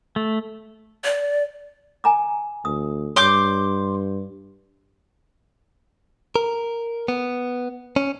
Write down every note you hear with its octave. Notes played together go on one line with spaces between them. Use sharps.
A3
D5
G#5 A#5 D6
D2 D#6
G2 C#5 C6 D6 G6
A#4
B3
C#4